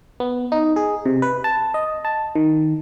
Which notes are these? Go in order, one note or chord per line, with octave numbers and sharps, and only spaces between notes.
B3
D#4
G#4
C3
B4
A5
D#5
A5
D#3